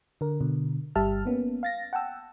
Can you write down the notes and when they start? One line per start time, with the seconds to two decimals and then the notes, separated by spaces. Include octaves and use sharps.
0.21 D3 A#4
0.41 B2 D3
0.95 G1 G3 G4 E5 A5 F6
1.25 A#3 B3 C#4
1.63 F5 A6 A#6
1.93 F#5 G5 A5 E6